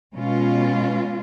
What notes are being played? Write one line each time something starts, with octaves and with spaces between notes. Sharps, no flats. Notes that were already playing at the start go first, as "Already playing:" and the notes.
B2 G#3 C#4 F4